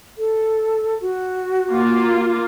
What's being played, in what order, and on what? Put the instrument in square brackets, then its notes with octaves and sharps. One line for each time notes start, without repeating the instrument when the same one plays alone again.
[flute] A4
F#4
[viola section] A#3 F4